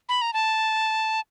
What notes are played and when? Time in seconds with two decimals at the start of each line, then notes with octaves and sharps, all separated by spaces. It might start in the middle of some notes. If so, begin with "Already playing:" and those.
0.09 B5
0.22 A#5
0.33 A5